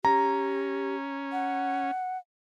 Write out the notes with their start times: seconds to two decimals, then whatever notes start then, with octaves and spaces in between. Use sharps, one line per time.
0.05 C#4 G4 A#5
1.32 F#5